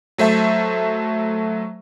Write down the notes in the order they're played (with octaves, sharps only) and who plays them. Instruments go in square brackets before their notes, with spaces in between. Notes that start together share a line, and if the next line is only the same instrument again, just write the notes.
[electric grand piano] F#3 A3 C5 E5 A5